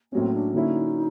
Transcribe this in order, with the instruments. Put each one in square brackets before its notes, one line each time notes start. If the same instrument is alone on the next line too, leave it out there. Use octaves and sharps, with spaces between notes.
[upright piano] A2 F#3 A#3 C#4 [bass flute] C4
[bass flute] D4
[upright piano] D3 F#3 A#3 C#4 E4 [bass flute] D#4